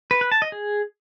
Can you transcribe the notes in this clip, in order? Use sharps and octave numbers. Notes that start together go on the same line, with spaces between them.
B4
B4
A5
D#5
G#4